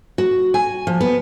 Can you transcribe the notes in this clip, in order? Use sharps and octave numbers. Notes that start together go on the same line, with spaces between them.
F#4
G#5
F3
B3